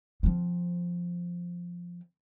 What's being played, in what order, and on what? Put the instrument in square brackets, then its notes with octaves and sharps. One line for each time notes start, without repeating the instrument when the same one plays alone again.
[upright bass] F3 C4